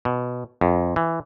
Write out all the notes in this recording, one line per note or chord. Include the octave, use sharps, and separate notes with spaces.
B2
F2
E3